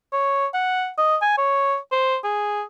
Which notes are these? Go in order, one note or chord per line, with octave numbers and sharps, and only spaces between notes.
C#5
F#5
D#5
G#5
C#5
C5
G#4